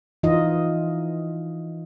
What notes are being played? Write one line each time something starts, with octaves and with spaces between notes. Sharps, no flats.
E3 D#4 F4 D#5